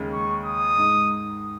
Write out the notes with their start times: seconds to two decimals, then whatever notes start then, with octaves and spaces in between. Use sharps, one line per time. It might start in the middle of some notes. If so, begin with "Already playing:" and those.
Already playing: D#2 C#3 G#3 C#4
0.13 C#6
0.45 D#6
0.76 G#2 G#3 D#4